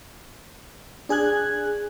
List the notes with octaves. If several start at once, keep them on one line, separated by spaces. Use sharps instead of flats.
D4 G#4 G#5 F#6 G#6